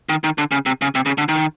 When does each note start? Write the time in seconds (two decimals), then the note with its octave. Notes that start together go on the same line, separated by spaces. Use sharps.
0.09 D#3
0.24 D#3
0.38 D3
0.52 C#3
0.66 C3
0.82 C#3
0.95 C3
1.06 C#3
1.18 D3
1.29 D#3